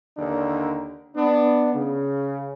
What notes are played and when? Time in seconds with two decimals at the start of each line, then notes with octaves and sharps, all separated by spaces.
0.17 D#2 D3 D4 A#4
1.16 B3 D4
1.74 C#3